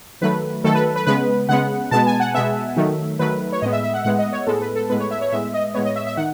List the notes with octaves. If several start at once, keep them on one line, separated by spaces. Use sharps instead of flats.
D#3 F#3 A3 B4
D#3 F#3 A3 A4
B4
B4
C#3 G#3 B3 B4
C#3 G#3 B3 F#5
B2 G#3 B3 A5
G#5
F#5
B2 G#3 B3 E5
D#3 F#3 A3
D#3 F#3 A3 B4
C#5
A2 G#3 B3 D#5
E5
E5
F#5
A2 G#3 B3 F#5
D#5
C#5
A2 G#3 B3 A4
B4
A4
A2 G#3 B3 B4
C#5
E5
C#5
A2 G#3 B3 E5
D#5
A2 G#3 B3 C#5
D#5
E5
E5
D#3 F#5